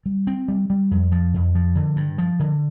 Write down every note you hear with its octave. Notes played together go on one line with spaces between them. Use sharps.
G3
C4
G3
G3
F2
F3
F2
F3
D3
G2
F3
D3